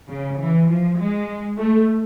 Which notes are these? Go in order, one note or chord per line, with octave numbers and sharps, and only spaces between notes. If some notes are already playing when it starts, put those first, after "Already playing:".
C#3
E3
F3
G#3
A3